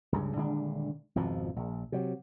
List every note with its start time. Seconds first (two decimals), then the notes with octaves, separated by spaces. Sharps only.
0.12 C#2 G2 C#3
0.36 D#1 D3 G#3 D4
1.15 G#1 F2 B2 F3
1.56 A#1
1.92 C3 F#3